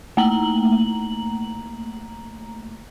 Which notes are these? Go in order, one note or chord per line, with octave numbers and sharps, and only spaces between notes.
A3 A#3 A#5 F#7